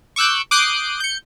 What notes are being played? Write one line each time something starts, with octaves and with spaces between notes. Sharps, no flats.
C#6 D6 E6 F#6 G6
D6 D#6 F#6 G6 C7 D7
G6 C#7